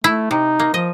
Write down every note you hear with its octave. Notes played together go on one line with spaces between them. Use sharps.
A3 E4
C3 D#4
A#3
F3 D#5